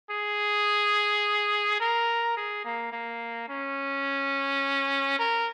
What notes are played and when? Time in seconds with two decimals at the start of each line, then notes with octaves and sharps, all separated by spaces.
0.11 G#4
1.80 A#4
2.37 G#4
2.65 A#3
2.92 A#3
3.49 C#4
5.19 A#4